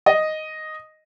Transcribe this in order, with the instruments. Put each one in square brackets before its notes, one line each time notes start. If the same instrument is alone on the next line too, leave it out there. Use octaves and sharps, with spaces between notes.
[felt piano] D#5